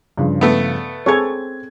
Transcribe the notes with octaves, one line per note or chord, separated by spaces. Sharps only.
G2 C#3 F3
A3 B3
C4 G#4 A4 C#5 G#6